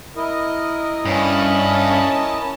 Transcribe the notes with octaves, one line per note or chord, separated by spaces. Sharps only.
E4 A#4 D#5
G2 C#4 A5